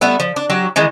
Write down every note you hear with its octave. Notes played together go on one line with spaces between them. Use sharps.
G3 A3 B3 E5
F3
D4
F#3 F#4 G4
D#3 E3 G#3